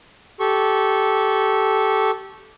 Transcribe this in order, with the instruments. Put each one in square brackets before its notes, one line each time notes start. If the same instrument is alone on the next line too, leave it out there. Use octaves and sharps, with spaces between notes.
[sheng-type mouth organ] G4 A4 C#6